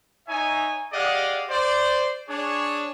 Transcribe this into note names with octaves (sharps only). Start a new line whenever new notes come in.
D#4 C#5 E5 G#5
G4 G#4 D5 D#5 F5 F#5
C5 D5
D4 G#4 C#5